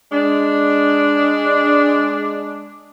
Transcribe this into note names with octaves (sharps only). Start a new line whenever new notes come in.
G#3 D4